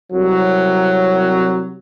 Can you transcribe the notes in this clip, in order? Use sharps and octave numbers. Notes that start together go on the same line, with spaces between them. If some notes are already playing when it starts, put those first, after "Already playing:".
C2 F#3